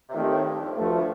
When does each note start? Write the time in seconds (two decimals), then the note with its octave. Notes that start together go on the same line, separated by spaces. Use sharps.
0.09 C3
0.13 A#2 D#3 A3 C4 G4
0.29 A2
0.44 G2
0.60 F2
0.76 D2 G2 D3 F3 A3
0.96 A2